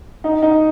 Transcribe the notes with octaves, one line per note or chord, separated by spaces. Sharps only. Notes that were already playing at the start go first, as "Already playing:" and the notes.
D#4
D#4